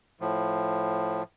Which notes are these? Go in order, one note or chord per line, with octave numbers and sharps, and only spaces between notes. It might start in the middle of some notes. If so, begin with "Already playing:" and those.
A2 F3